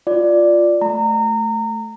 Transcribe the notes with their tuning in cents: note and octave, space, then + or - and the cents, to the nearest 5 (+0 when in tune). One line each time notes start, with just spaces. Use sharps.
F4 +0 D5 +0
A3 -10 A#5 -25